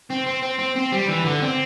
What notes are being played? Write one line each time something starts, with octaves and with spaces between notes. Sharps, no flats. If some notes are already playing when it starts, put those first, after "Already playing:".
C4
C4
C4
C4
C4
G3
E3
D3
C4